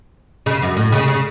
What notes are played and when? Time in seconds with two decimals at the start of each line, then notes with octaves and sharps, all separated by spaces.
0.46 C#3
0.62 F#2
0.77 A2
0.92 C#3
1.08 C#3